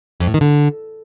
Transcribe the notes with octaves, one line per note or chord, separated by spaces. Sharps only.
F2
A2
D#3
D3